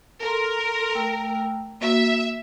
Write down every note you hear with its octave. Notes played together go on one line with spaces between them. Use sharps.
A4 A#4 C6
A3 G5 E6
A#3 F#4 E5